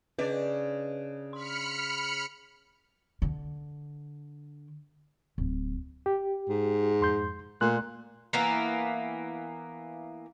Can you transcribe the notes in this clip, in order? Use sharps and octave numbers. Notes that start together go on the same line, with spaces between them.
C#3 D4 B4 D5 D#5 D6
B5 C6 F6 C#7
D3
D1
G4
G#2
F2 C6 G6
A#2 A3 C6 F#6
E3 A#3 B3